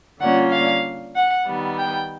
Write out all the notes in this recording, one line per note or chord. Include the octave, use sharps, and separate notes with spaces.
D3 G3 A#3 C#4 F4 F#5
F5
F#5
D#3 G3 B3
G5